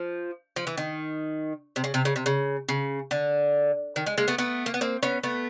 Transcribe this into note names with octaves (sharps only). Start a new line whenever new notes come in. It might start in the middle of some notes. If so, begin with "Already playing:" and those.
Already playing: F3
F3
E3
D#3
C3
C#3
C3
C#3
C3
C#3
C#3
D3
D#3
G#3
G#3 A#3
A3 B3
A3 B3
A#3
B3
A#3 C4
B3 C#4
A3 B3